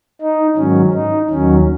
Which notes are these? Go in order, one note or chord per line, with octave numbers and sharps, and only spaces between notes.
D#4
G#2 D#3 F#3 C#4
D#4
D#2 D#3 F#3 C#4